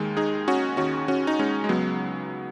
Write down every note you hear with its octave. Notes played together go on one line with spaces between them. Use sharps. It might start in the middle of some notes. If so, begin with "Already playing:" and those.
Already playing: D#2 D#3 G#3
D#4 G#4
C#4 F#4
D#2 D#3 C#4 F#4
C#4 F#4
D#4
G#3 C#4
G#3
C#2 C#3 F#3 B3